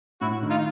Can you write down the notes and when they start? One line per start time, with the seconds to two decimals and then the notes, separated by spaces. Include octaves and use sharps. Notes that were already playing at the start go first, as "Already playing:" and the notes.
0.21 A2 E4 F#4
0.42 D#3
0.50 D#4 F4